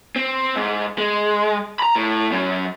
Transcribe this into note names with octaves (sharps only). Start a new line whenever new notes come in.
C4
G#2
G#3
A#5 B5
A2
F#3 C#4